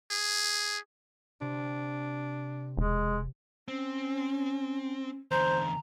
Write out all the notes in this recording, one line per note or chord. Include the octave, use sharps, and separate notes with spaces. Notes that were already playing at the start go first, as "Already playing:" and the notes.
G#4
C3 D4
E1 G#3
C4 C#4
E2 D3 C5 A#5